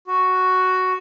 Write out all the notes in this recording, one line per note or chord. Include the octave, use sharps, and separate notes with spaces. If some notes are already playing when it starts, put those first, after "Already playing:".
F#4